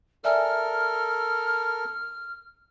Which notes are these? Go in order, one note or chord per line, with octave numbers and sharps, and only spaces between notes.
A4 A#4 D5 E5 G#5 F6